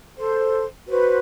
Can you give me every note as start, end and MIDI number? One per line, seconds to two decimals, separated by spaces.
0.17 0.64 69
0.17 0.64 72
0.88 1.18 66
0.88 1.18 71
0.88 1.18 72